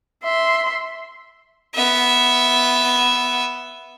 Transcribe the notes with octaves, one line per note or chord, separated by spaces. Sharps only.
E5 C6
B3 E5